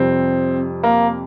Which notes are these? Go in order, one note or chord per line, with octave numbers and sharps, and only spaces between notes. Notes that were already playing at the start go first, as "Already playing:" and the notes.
Already playing: F2 C3 G3 C4
A#3